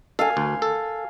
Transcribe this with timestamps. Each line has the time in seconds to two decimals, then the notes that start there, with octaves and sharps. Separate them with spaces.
0.19 A4 F5 G#5
0.37 D2
0.62 A4